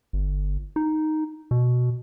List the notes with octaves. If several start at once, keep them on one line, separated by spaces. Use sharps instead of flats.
G1
D#4
B2